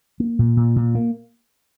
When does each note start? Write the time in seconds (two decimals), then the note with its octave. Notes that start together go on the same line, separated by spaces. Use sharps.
0.20 A#3
0.39 A#2
0.57 A#2
0.76 A#2
0.95 A#3